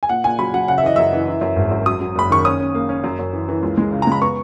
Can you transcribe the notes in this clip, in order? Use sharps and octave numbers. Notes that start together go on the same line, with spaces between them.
G#5
A#2 F#5
A#2 G#5
F#3 B5
F#3 F#5
C#3 F#5
E5
E3 D#5
F#2 E5
E3
E3
F#2
G#1
F#2
F#3 D#6
F#3
F#1 B5
D#3 C#6
C#4 D#6
C#4
A#3
C#4
F#2
F#2
E3
E3
C#2
G#3
C#3
A#5
G#3 B5
B3 C#6